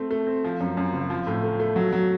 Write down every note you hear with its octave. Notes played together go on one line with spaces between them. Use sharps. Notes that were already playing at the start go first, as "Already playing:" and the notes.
Already playing: A3 C4
A3
C4
F3
F#2
F#2
F#1
F3
A2
A3
A3
F#3
F#3